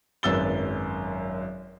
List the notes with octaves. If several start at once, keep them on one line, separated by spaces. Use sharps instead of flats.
G#1 F#2 B4 E6 A6 G7